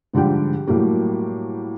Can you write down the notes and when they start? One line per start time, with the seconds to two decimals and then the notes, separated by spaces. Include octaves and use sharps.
0.13 G#2 D3 F3 G3 G5
0.67 A2 F#3 G3 A3 A#3